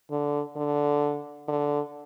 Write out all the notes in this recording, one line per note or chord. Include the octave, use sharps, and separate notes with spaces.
D3
D3
D3